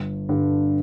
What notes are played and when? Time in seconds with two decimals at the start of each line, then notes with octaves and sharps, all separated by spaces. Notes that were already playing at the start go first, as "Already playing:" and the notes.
Already playing: G1
0.29 G2 D3